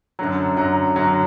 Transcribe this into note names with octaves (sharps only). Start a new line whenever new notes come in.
F#2 D3 F#3
F#2 D3 F#3 A#5
F#2 D3 F#3 A#5